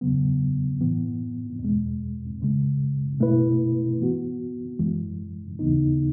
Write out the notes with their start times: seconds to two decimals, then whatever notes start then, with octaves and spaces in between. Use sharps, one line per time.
0.01 E2 C#3 F#3 B3
0.81 A2 E3 B3
1.60 E2 B2 G#3
2.40 C#2 C#3 G#3
3.20 B2 A3 E4 B4
3.99 E3 B3 F#4
4.79 F#2 E3 G#3
5.59 D#2 C#3 E3 B3 D#4